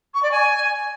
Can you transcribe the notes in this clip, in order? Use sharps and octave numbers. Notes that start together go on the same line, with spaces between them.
C#6
D5
G#5